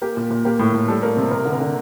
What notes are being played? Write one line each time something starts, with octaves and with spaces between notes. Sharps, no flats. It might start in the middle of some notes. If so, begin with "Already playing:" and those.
A#3 G4
A#2
A#2
A#3 G4
A2
A2
G3 A4
A#3
C3
A#3 A#4
D3
A#4
D3